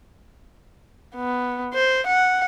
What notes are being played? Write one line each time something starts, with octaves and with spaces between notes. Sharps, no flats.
B3
C5
F#5